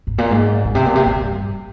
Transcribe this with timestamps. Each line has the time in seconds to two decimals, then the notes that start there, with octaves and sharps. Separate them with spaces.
0.07 G#2
0.18 A#2
0.31 G#2
0.65 A#2
0.75 C3
0.85 A#2
0.95 C3
1.06 A#2
1.21 G2